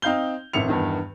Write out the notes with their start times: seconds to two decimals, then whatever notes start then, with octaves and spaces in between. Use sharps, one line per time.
0.02 C4 D#4 F5 G6 G7
0.53 A1 F2 D#3 E5 C#7 F7
0.68 E2 G2 D#3